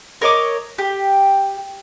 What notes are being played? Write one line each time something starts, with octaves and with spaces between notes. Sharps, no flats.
A#4 C#5 D#5 D6
G4